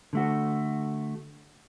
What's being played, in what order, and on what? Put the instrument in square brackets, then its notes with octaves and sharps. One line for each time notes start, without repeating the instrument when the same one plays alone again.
[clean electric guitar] D3 A3 F#4